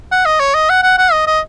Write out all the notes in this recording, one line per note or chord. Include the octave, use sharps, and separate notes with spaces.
F#5
D#5
C#5
D#5
F#5
F#5
F#5
D#5
D#5